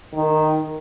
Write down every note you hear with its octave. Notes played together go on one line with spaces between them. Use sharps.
D#3